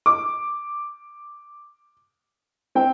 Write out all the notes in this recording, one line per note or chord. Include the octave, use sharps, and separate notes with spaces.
D6
C4 G5